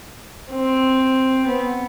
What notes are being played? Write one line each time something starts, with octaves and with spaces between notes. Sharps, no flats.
C4
B3